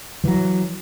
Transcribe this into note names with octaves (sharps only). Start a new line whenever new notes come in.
E3 F#3